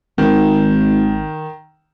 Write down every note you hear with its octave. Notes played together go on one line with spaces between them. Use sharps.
G#1 D#3